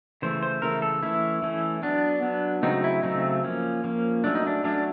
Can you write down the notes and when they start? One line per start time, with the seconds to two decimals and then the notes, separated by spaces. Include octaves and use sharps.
0.22 C#3 E3 A3 C5
0.43 C5
0.62 C#3 E3 A3 A#4
0.82 A4
1.03 E3 A3 C#4 E4
1.42 E3 A3 C#4
1.83 F#3 B3 D4
2.23 F#3 B3
2.63 C#3 F#3 A3 C4 D#4
2.84 E4
3.03 C#3 F#3 A3 C4 D#4
3.44 F3 A#3 C#4
3.84 F3 A#3 C#4
4.24 F#3 A3 C#4 D4
4.35 D#4
4.47 D4
4.64 F#3 A3 C#4 D4